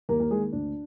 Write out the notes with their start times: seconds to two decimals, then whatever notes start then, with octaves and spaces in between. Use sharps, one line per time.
0.09 D#2 A#3 A#4
0.20 A#3 A#4
0.31 D#3 G#3 A#3 G#4
0.52 D2 D4